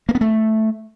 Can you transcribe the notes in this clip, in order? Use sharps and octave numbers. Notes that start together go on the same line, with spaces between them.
A#3
B3
A3